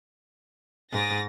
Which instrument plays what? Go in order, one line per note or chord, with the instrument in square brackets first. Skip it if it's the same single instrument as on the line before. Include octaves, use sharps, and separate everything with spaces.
[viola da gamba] G#2 [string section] A6 A#6